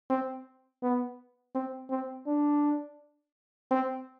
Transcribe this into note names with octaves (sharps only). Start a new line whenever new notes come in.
C4
B3
C4
C4
D4
C4